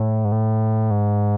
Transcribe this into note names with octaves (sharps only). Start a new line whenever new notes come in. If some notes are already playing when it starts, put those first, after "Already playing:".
Already playing: A2
G#2
A2
G#2